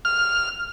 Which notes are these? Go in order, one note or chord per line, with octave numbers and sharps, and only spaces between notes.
F6